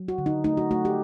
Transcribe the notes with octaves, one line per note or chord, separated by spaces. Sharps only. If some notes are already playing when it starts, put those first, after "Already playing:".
Already playing: F#3
F#4
D3
D#4
A3 D#4
F#4
A3 F#4
G4